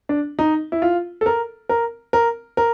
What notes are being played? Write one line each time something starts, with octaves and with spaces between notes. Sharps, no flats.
D4
D#4
E4
F4
A4
A#4
A#4
A#4
A#4